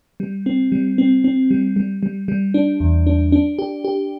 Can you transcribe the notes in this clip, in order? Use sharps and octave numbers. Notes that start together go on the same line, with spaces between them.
G3
C4
G3
C4
C4
G3
G3
G3
G3
D4
E2
D4
D4
G4
G4